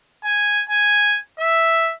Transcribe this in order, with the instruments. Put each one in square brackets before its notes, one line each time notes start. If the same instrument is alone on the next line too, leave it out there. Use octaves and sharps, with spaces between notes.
[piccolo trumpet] G#5
G#5
E5